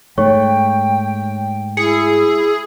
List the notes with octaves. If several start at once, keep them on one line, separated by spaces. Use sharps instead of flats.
G#2 A3 C#5 G5 C#6
E4 G#4 C#7